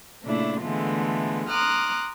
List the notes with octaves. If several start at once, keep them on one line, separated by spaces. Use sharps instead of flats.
A#2 C#3 A3 D4 E4
D3 E3 G#3 A3 B3 F4
A#5 C6 D6 D#6 F6 F#6